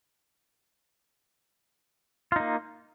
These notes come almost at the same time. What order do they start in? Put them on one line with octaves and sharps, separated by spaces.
F4 D#4 A#3